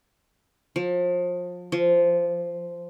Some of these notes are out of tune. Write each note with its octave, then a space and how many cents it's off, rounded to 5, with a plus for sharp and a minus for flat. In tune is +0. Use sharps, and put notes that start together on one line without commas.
F3 +30
F3 -10